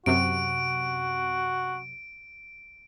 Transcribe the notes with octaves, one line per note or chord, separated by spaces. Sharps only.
F#2 C3 F#4 D7